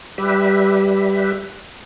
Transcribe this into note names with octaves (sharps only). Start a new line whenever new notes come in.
G3 G4 B4 E5